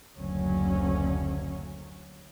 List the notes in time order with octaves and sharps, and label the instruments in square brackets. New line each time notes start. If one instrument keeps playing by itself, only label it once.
[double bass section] F#1 D2 F#3 C#4